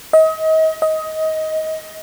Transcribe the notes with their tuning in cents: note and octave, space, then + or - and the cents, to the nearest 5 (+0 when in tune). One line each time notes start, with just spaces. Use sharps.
D#5 +35
D#5 +20